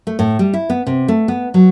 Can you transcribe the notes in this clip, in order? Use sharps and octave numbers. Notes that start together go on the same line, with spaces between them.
A3
A2
G3
E4
B3
C3
A3
B3
F#3